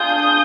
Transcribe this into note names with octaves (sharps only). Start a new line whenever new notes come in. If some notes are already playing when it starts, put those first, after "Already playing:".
Already playing: D4 F4 G#4 D#6 G6